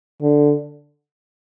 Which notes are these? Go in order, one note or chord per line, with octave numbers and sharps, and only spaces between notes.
D3